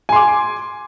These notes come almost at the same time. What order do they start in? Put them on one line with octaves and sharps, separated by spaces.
G#5 C6 D6